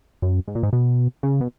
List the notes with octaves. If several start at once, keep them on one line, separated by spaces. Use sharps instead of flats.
F#2
G#2
A#2
G#2
B2
C#3
B2